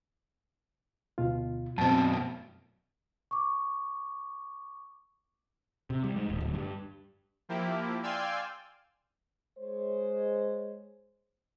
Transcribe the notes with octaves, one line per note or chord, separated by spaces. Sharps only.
D2 B2 F4
F#2 B2 C4 A5
C#6 D6
C3
G3
G#2
D#1
D1
G2
F3 A#3 E4 G4
D5 F5 G5 G#5 C6 E6
G#3 C5 C#5